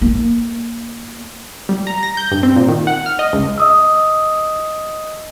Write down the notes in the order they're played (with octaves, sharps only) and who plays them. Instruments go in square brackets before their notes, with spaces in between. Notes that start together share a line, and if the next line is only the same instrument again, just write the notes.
[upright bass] A#3
[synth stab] G3
A#5
A#6
G6
G2
C4
A#2
D#3
F#5
F6
D#5
C#2
[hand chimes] D#5 D#6 E6